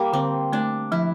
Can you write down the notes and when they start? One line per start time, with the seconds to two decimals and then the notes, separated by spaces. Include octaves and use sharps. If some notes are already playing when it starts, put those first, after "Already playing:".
Already playing: G3 A#3 G4
0.13 D3 C4
0.53 A3 D4
0.92 F3 E4